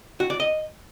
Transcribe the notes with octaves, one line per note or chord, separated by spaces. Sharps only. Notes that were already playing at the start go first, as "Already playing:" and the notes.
F#4
D5
D#5